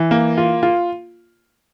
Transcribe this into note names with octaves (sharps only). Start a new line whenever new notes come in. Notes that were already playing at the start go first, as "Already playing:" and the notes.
Already playing: E3
A#3
F4
F4